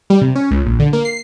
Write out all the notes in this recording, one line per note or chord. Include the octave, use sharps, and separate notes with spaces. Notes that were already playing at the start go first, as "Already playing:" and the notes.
G3
C3
C#4
C#2
A#1
D3
A#3
C7